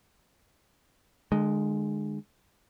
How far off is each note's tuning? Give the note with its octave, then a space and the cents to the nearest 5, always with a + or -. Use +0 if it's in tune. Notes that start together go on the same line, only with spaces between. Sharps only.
D3 +40 G#3 +0